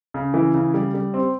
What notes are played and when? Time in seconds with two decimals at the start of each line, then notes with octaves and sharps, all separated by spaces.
0.14 C#3
0.34 E3
0.54 C#3
0.74 G3
0.94 G3
1.14 C4